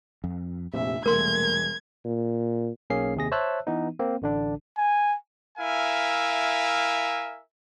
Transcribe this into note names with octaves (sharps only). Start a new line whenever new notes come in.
F2
F1 A#1 C3 E5
E1 C2 A3 A#3 A#4 C6 G#6
A#2
B1 A#3 C#4 G#4 C7
D#2 C3 G#4 A#6
C5 C#5 E5 A5 E6 F#6
E3 B3 D#4
A#3 C4
A1 D3 D4
G#5
E4 A#4 E5 F5 G#5